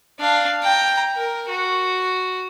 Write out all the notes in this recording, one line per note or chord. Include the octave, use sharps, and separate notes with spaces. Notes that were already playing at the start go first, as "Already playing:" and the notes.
D4 F5
G5 A#5
A#4
F#4